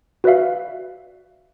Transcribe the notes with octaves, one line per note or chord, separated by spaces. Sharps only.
F#4 B4 D5 E5 F5